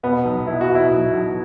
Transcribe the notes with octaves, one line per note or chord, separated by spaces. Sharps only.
B2 B3
B1
B2 E4
F#4
B2
E4
B1
B1